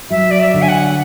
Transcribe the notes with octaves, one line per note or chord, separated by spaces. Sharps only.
F#3 E5
D5
E5
D3
G#5
F#5